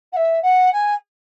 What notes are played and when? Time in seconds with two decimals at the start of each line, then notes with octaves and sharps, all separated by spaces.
0.12 F#5
0.16 E5
0.42 F#5
0.72 G#5